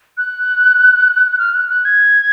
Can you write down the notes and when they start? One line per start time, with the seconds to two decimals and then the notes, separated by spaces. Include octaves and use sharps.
0.17 F#6
1.39 F6
1.54 F#6
1.69 F#6
1.85 G#6